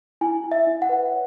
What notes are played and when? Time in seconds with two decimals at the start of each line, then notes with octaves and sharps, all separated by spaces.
0.21 E4 G#5
0.44 E4
0.51 E5
0.67 E4
0.82 F#5
0.89 B4
1.12 C#5